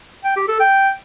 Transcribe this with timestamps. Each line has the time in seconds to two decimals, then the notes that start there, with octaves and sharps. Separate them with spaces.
0.24 G5
0.36 G4
0.48 A4
0.60 G5